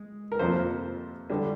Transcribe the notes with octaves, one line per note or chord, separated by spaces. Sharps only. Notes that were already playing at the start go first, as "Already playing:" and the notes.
Already playing: G#3
A#4
F2 C3 F3 A#3 C5
D3 G3 D4